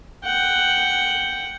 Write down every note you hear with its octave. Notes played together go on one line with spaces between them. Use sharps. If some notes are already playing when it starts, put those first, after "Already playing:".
F#5 G5